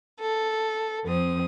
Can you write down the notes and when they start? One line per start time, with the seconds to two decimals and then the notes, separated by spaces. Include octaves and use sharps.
0.19 A4
1.05 F2 C4 D#6